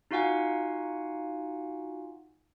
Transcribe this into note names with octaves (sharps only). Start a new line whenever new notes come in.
D#4 F4 F#4 F5 F#5 G#5